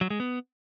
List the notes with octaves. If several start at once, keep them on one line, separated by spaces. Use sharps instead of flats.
F#3
G#3
B3